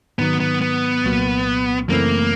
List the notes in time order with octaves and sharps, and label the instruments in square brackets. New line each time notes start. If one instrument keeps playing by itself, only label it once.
[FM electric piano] G#2 D#3 F#3 [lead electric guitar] B3
[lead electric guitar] B3
B3
[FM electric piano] C2 A#2 F#3 A#3
[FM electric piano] F#2 C#3 E3 A3 C4 [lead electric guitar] A#3